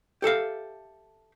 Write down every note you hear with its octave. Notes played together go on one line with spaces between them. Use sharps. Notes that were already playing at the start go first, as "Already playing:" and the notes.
G4 A4 E5 F5